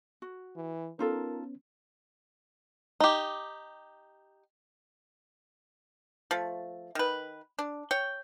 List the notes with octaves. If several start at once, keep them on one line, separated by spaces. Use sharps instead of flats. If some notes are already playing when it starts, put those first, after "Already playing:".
F#4
E3
B3 C#4 D#4 F4 A4 A#4
D#4 G4
F3 A3
D#3 B4
D4
C#5 G5